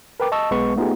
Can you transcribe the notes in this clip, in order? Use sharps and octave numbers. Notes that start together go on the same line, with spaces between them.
A#4 B4 G5 D6
D#5 A5 C#6 E6
B1 G#3 B3 B4 C#6
A3 B3 D#4 F4 G4 G#4